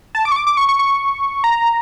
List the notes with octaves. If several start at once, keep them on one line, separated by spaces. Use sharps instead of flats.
A5
D6
C#6
D6
D6
C#6
C#6
C#6
A#5